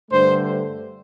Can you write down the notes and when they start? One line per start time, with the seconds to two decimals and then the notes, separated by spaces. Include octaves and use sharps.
0.11 G2 D3 A3 C5